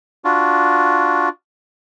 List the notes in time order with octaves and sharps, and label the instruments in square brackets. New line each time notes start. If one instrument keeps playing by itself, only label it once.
[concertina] D4 F4 F#4